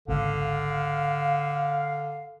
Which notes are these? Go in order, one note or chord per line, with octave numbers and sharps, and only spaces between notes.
G#1 C#2 D3 F5